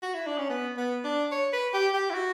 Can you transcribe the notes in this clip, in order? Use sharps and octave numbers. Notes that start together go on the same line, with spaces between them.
F#4
E4
D4
C#4
B3
B3
D4
C#5
B4
G4
G4
E4
F#4